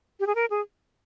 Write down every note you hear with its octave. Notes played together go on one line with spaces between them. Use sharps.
G4
G#4
A#4
G#4